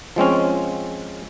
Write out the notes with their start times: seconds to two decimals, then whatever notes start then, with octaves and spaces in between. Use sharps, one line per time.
0.16 F3 G#3 C4 C#4